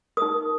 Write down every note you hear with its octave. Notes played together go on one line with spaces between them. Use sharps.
D#4 A#4 D#6